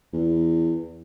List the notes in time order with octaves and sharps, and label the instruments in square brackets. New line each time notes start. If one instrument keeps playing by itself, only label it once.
[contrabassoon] E2